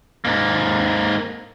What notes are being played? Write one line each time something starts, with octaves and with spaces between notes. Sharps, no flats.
G#2 A#3